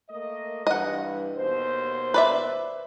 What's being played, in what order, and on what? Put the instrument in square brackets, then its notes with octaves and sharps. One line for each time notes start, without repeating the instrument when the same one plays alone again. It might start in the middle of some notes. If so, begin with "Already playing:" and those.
[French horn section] A3 A#3 D#5
[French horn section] G2 E3 [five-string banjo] D#5 F#5
[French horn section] D#2 B2 C5
[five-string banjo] B4 D5 E5